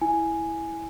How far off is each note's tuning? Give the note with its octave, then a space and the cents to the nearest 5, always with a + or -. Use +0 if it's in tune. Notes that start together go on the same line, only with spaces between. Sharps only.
E4 -5 G#5 +0